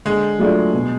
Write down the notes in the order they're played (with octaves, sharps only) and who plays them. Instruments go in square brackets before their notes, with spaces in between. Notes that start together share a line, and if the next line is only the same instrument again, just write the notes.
[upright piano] D3 [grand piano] G#3
[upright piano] F#3 A3 D4 F4
B2